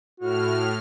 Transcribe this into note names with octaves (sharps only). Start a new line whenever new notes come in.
A2 F#4 F6